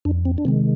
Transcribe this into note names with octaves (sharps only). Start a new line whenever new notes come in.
F2 D4
C4
D4
C3 D#3 G#3 C4